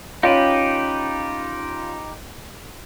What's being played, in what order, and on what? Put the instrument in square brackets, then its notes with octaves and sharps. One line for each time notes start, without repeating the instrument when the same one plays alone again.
[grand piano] C#4 F4 [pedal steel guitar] D#4 G4 B4